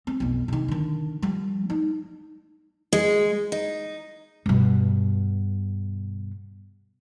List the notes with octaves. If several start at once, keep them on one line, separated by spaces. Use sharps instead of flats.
C4
B1 F2
C3 D#3
D3 D#3
F3 G3
D#4
G#3
D#4
G2 B2